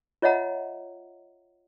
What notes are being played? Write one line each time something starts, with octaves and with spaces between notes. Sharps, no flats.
F4 C#5 D#5 E5 F#5 A#5